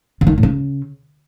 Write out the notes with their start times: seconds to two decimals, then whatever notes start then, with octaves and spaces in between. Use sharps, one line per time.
0.21 C#3
0.27 D#3
0.32 D4
0.38 A2
0.43 C#3